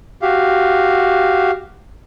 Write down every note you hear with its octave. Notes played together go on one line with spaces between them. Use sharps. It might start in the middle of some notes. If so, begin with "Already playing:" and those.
F#4 G4 F5